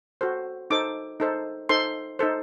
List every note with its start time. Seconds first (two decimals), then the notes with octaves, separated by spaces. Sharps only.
0.21 F#4 A4 C5
0.70 D#4 A4 C5 D6
1.20 D#4 A4 C5
1.69 D#4 A4 C5 C6
2.19 D#4 A4 C5